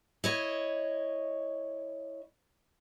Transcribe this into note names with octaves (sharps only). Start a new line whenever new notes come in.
E4 C#5 D#5